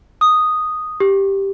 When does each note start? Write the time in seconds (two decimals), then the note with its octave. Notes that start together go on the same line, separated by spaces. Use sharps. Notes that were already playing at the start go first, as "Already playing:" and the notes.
0.21 D#6
1.00 G4